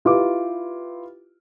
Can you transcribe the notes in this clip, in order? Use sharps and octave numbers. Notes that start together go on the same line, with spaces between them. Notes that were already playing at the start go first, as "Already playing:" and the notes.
E4 F4 G4 B4 D6